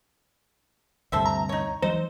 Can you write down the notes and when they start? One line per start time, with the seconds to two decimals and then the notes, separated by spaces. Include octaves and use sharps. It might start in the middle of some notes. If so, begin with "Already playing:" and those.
1.12 D2 G2 C3 A4 C5 E5
1.26 A#5
1.49 D#4 C#5
1.82 E3 F#3 G#3 D#4 C5